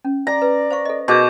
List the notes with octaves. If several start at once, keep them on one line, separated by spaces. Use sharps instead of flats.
C#4
D5 A#5
B4
C5 F5 C#6
A4 D#5
B2 D#4 G#4 A#4 C#6 D6 G6